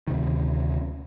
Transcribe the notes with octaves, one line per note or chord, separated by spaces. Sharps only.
D2 C3 D#3